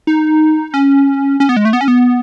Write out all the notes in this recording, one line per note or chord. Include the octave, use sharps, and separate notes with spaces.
D#4
C#4
C#4
B3
G#3
A3
B3
C#4
B3